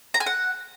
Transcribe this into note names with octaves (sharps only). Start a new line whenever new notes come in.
A#5
G#5
F#5